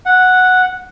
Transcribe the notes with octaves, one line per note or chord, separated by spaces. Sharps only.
F#5